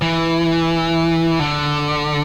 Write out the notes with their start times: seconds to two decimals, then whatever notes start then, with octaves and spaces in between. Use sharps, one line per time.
0.02 E3
1.39 D3